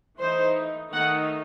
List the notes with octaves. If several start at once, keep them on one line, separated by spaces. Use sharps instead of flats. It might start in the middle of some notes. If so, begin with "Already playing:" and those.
E3 A3 D#4 C5
D#3 A3 D#4 F#5